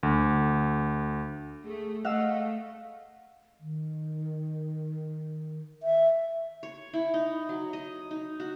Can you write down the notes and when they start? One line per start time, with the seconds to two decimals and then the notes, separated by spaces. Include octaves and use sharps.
0.03 D2
1.65 A3 G#4
2.05 A3 D#5 F5 F#5 E6
3.60 D#3
5.83 E5
6.63 C#5
6.94 E4
7.14 D#4
7.49 F#3
7.73 D#5
8.11 D#4
8.40 F#4